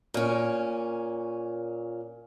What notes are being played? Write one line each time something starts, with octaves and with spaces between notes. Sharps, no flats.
A#2 C#4